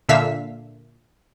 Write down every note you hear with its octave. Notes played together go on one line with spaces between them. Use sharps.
A#2 D3 E5 F5 B6